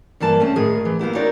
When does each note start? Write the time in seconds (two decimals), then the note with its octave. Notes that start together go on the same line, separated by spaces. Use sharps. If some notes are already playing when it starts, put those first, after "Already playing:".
0.20 G2 E3 A#3 A5
0.40 A3 C4 C#4
0.55 A2 D#3 G#4 A#4
0.85 E3
0.99 A#3 B3 E4 G4
1.15 C4 D#4 F#4 A#4 C#5 D5